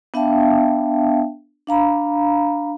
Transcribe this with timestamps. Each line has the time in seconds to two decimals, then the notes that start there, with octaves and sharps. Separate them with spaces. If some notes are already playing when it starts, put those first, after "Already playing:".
0.14 B3 D4 E5 F5 G5 A5
1.67 D4 F5 A#5 B5